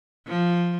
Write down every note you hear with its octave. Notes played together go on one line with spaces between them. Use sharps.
F3